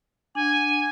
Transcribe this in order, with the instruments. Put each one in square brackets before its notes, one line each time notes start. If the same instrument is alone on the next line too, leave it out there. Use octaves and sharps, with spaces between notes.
[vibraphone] D4 F#5 [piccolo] G#5